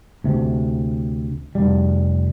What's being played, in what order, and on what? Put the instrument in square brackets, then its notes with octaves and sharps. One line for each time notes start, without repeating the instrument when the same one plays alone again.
[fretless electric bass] D2 C3
F1 G3